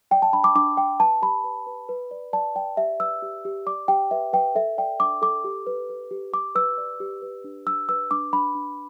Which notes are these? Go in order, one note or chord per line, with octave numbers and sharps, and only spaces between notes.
D5 G5
A5
D4 B5
D6
D4 D6
D4 G5
B4 A5
G4 B5
B4
B4
B4
D5
D5 A5
D5 G5
G4 E5
B4 E6
G4
G4
D5 D6
G4 G5
B4 E5
B4 G5
A4 E5
D5 G5
D4 D6
A4 D6
G4
B4
B4
G4
G4 D6
B4 E6
D5
G4
B4
D4
D4 E6
B4 E6
D4 D6
D4 B5
D4